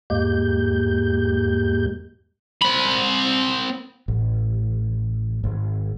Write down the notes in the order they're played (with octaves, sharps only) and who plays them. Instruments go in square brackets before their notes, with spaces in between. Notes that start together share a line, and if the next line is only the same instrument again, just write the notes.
[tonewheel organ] E2 G#2 G#3 A#3 G4 G6
[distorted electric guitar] C4 B5
[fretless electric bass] A1
G#1